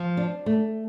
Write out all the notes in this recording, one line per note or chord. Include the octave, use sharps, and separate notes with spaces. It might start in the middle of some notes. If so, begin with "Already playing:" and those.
Already playing: F3
D4
A3